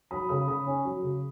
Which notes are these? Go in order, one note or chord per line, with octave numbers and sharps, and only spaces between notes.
F#3 B5 D#6
C#3 B5 D#6
C#3 B5 D#6
C#4
F#3
C#3